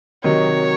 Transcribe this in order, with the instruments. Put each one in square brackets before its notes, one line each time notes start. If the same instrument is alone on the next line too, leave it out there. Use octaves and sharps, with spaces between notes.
[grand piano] C3 D#3 F#3 [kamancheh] C#5